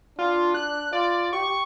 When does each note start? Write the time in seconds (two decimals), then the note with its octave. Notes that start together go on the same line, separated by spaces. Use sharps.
0.19 D4 F4
0.54 F#6
0.93 F4 D5
1.33 G4 C#6